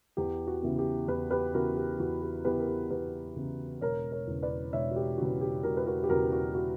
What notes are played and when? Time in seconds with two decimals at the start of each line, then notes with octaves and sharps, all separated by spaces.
0.17 E2 G4
0.47 F#4
0.63 C#3 E3 B3
0.79 G4
1.08 E2 G4 B4
1.31 G4 B4
1.54 C#3 E3 B3 F#4 A#4
1.76 G4
1.99 E2 F#4
2.23 G4
2.45 C#3 E3 B3 G4 B4
2.59 A#4
2.68 G4
2.90 E2 G4 B4
3.36 C#3 E3 B3
3.81 E1 A#4 C#5
4.12 A#4 C#5
4.27 E2 C#3
4.43 B4 D5
4.73 E1 C#5 E5
4.91 F#4
4.96 G4
5.18 E2 C#3 F#4
5.41 G4
5.63 E1 F#4 A#4
5.77 B4
5.86 F#4 A#4
6.04 G4
6.09 E2 C#3 F#4 A#4
6.32 F#4
6.55 F#4